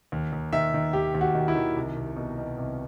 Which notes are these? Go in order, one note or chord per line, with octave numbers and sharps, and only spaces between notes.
D#2
D#2
D#3 E5
D#3
D#2 G4
D#2
F#4
D#3
E4
D#3
C2
C2
B2
B2
C2